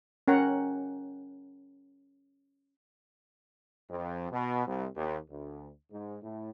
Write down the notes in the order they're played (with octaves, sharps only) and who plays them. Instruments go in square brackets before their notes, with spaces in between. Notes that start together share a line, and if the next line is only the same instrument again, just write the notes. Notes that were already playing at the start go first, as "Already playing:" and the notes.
[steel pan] C#4 A#4 F#5 G5 A#5
[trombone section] F2
B2
C2
D#2
D2
G#2
A2